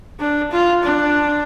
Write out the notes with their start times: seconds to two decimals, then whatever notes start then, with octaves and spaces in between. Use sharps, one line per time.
0.20 D4
0.52 F4
0.83 D4